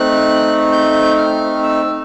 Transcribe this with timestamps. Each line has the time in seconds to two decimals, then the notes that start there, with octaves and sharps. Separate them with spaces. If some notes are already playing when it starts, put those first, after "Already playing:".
Already playing: A3 C4 D#4 F#6
0.72 G6
1.18 F6
1.63 E6